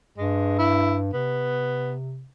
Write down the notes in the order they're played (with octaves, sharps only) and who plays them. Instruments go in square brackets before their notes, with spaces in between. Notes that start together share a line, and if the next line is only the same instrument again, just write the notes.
[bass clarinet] G2 [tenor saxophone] G#3
[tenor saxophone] E4
[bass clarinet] C3 [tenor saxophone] B3